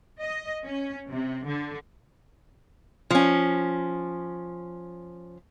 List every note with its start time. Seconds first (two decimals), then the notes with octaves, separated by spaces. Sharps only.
0.20 D#5
0.64 C#4
1.09 C3
1.46 D3
3.10 F3 C#4